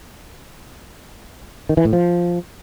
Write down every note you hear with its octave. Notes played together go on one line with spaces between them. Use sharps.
D#3
E3
A2
F3